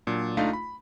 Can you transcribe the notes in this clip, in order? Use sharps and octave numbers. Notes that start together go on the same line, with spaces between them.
A#2 F#3 D4
C#2 A3 D4 D#4 F4 F5
B5